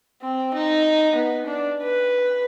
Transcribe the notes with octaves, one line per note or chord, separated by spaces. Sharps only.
C4
D#4
B3
D4
B4